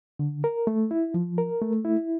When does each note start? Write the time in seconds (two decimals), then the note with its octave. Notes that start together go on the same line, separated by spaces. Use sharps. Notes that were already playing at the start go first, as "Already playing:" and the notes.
0.19 D3
0.44 A#4
0.67 A3
0.91 E4
1.14 F3
1.38 A#4
1.62 A3
1.85 E4